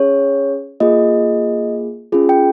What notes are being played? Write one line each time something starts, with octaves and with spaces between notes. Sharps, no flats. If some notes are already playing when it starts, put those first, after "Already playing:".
Already playing: C#4 G#4 C#5
A#3 F4 G#4 D#5
C#4 F4 G#4
G5